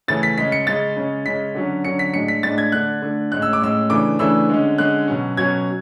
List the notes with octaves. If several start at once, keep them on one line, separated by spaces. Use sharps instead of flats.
C#3 E3 A3 C#4 A6
B6
C#3 G#3 C#4 B6
C#7
C#3 G#3 C#4 A6
C#3 G#3 C#4
C#3 G#3 C#4 B6
D3 F#3 C#4
D3 F#3 C#4 C#7
B6
A2 G#3 D4 C#7
B6
A2 G#3 D4 A6
G#6
D3 A3 D4 F#6
D3 A3 D4
A2 G#3 C#4 F#6
E6
D6
A2 G#3 C#4 E6
C#3 E3 A3 D4 D6
C#3 E3 A3 D4 E6
D3 G#3 C#4
D3 G#3 C#4 F#6
B2 F#3 C#4
B2 F#3 C#4 G#6